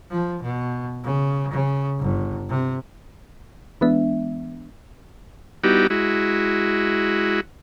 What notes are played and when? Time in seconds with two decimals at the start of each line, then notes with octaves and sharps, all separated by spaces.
0.10 F3
0.42 B2
1.04 C#3
1.51 C#3
1.99 G1
2.49 C3
3.81 E3 G#3 B3 D4 E5
5.64 G3 B3 D#4 E4 F#4 G4
5.90 G#3 E4 F#4